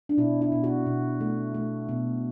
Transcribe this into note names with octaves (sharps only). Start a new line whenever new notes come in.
D4
B2 E4
E4
B2
F#4
B2
A3
A3
B2